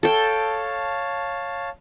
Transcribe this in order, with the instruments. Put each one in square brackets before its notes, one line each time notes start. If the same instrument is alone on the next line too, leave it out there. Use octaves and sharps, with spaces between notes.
[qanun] A4 G5 [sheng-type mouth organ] C#5 F5 A5